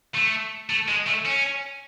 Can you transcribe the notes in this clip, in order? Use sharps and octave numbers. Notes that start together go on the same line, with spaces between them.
A3
A3
G#3
A3
C#4